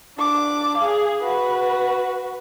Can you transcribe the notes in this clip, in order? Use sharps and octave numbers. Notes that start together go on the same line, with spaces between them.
D4 D6
G#4 F5
F#4 B4